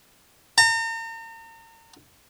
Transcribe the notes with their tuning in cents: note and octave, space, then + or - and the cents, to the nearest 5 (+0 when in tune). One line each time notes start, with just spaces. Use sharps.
A#5 -40